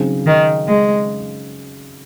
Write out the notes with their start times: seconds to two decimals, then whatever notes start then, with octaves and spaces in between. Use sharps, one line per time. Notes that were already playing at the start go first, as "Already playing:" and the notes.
Already playing: C#3 F#3 C4 D#4 G#4
0.26 D#3
0.66 G#3